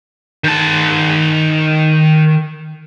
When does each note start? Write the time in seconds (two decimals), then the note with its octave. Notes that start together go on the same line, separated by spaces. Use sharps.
0.44 D#3 A5